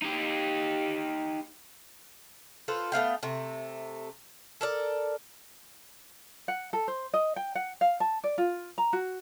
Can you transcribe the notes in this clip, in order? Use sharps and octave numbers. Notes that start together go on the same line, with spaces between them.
D#4 G4
F4 A4 B4 C5
A3 B3 F5 G5
C3 A3
A4 A#4 D5
F#5
A4
C5
D#5
G5
F#5
F5
A5
D5
F4
A#5
F#4